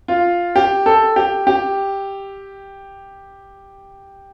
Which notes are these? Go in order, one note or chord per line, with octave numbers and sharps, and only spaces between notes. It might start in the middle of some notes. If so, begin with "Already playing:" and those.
F4
G4
A4
G4
G4